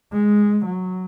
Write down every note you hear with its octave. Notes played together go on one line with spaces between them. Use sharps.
G#3
F#3